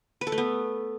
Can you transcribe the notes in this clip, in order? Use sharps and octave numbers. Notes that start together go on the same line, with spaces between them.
B4
A4
A3
B3